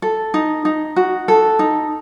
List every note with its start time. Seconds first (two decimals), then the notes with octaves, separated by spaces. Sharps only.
0.02 A4
0.34 D#4
0.65 D#4
0.96 F#4
1.28 A4
1.59 D#4